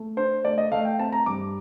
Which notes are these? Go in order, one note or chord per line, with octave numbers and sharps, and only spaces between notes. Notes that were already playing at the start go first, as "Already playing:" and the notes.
Already playing: A3
D4 C5
A3 D5
D#5
A3 F5
G5
C4 A5
A#5
G2 D6